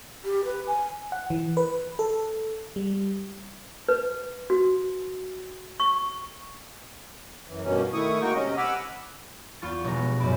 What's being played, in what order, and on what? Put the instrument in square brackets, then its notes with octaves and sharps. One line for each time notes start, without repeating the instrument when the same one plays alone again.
[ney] G4
B4
G#5
[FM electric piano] F#5
E3
B4
A4
G3
[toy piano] B4
F#4
C#6
[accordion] F#2 E3
G2 B2 A#3 C#4
D#3 A3 E4 C#6 D#6
G#3 A#3 D#4 F#4 G5 C#6
C3 C#4 D#5
F#5 G#5 B5 D6 E6 F6
[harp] E2 B3 F4 C#6 A6
F1 B2 G#3 A#5
B3
F#2 A2 F#4 D5 B5